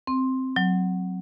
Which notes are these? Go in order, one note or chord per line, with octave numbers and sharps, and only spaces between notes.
C4
F#3